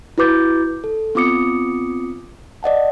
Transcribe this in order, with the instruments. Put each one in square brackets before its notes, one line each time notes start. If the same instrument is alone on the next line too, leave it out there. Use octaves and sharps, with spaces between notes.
[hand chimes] E4 F#4 B4 D6 G6 A6
A4
B3 C4 F4 D6 D#6 C#7
D5 D#5 F#5 A5